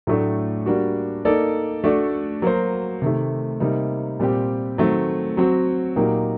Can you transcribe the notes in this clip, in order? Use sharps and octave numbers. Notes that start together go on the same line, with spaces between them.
A2 F#3 A3 D4 A4
G3 A#3 D4 F#4
A#3 D#4 A4 D5
A3 D4 F#4 A4 D5
F#3 A#3 F#4 C5
C3 D#3 A3
C3 G3 A#3 D#4
A#2 G3 C4 G4
D#3 F#3 A3 C4
F#3 C4 F#4
A#2 F#3 A#3 D#4 G4